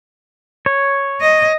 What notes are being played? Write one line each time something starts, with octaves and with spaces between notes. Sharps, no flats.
C#5
D#5